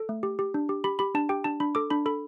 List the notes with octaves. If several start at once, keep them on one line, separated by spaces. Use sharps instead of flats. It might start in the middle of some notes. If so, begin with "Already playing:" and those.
Already playing: A4
A3
G4
G4
D4
G4
G4 B5
G4 B5
D4 A5
G4 G5
D4 A5
D4 B5
A4 D6
D4 B5
A4 B5